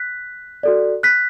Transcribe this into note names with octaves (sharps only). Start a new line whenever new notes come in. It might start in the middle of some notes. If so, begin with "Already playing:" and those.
Already playing: F#6 B6
F#4 A4 D5
F#6 B6